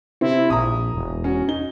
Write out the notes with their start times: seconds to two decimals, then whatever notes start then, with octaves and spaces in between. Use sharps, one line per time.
0.21 C3 C4 E4
0.50 A#1 A#5 D#6
0.93 E1
1.24 C#4 F#4
1.48 D#4 G7